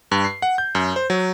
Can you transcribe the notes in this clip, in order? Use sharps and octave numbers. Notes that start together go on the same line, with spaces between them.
G2
C7
F#5
G6
F#2
C5
F#3